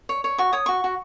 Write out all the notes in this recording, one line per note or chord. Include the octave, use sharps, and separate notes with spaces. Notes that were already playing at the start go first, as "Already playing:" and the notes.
C#5
C#5
F#4 C#6
C#5 D#6
F#4 C#6
F#4